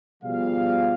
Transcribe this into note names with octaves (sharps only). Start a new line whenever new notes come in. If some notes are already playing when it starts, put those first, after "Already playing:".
B2 F3 G3 G#4 F5